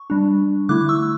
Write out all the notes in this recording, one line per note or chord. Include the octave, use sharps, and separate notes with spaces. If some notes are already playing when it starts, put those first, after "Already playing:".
Already playing: C#6
G3 D4
D3 A3 E4 D6 F#6
C#6 E6